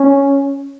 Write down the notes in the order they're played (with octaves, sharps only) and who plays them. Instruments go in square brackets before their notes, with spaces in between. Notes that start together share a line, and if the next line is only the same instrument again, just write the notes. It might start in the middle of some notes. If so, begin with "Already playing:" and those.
Already playing: [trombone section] C#4